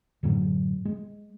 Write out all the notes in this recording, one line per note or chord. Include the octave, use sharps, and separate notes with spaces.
F#2 A2 D3 F#3
G#3